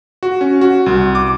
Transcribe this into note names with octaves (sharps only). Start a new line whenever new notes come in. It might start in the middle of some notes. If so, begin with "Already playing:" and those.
F#4
C#4
F#4
C2
D6